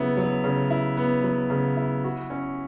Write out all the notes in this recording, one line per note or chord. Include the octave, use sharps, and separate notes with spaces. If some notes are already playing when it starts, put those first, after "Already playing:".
Already playing: C#3 F#3 B3 E4
F#3
C#3
E4
B3
F#3
C#3
E4
F#4
C#4